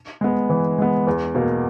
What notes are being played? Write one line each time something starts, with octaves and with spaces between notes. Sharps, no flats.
G#3 B3
E3
G#3 B3
E2
B2 A#3